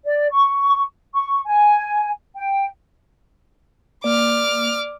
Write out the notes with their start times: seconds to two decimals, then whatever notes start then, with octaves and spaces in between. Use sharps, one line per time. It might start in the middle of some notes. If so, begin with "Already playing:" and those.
0.05 D5
0.31 C#6
1.14 C#6
1.46 G#5
2.35 G5
4.04 A#3 D5 D6 F6